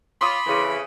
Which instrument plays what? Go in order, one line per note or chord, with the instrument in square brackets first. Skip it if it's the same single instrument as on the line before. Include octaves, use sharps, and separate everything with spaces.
[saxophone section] F4 C#5 [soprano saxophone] B5 [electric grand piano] C6 D6 D#6
[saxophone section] F2 C#3 E3